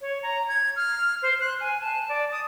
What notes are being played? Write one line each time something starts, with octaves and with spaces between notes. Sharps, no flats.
C#5
A#5
G#6
F6
C5
F#6
G#5
A5
D5
D#6